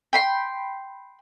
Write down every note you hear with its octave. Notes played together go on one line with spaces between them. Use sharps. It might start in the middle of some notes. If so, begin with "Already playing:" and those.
G5 B5 C6